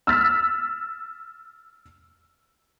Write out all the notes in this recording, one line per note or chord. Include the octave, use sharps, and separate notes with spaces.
E6 F6 A6 B6